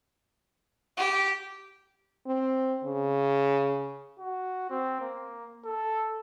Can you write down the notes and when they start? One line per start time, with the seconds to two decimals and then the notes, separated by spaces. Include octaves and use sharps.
0.97 G4
2.27 C4
2.84 C#3
4.19 F#4
4.70 C4
5.01 A#3
5.65 A4